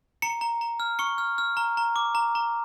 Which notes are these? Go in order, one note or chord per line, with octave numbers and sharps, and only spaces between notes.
A#5 C#7
A#5
A#5
F6
C#6 C#7
F6
F6
A#5
A#5
D6
A#5
A#5